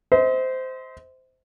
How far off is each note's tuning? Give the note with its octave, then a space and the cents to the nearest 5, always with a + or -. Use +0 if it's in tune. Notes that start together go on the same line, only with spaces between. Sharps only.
C5 -15 D#5 +45